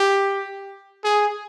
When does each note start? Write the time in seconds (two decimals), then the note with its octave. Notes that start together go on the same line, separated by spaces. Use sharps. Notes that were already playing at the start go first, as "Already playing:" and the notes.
Already playing: G4
1.04 G#4